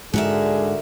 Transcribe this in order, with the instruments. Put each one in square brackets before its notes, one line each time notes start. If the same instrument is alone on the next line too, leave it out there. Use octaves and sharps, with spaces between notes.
[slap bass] G#2 G#3 [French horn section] D3 [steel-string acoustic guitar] F#4 A#4 E5 [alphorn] G#4